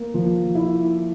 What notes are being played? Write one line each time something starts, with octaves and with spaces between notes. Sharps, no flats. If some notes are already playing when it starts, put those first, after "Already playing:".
Already playing: A#3
F3
E4